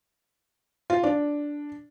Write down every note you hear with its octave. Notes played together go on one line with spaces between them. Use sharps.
F4
D4